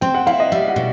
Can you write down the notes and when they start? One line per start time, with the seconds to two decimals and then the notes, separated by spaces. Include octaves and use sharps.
0.01 C4 G5
0.15 F#5
0.27 E4 F5
0.40 D#5
0.52 G3 E5
0.68 F#5
0.76 B2